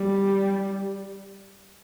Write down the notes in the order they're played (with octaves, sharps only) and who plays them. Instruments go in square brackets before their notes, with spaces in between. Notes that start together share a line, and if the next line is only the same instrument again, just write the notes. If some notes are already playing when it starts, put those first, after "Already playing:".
Already playing: [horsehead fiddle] G3